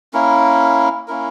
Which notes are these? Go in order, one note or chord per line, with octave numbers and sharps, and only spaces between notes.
A#3 C#4 E4 A#4
A#3 C#4 E4 A#4